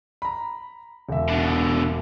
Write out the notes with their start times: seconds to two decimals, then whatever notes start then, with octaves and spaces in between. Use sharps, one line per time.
0.22 A#5 B5
1.09 E1 E5
1.28 B2 D3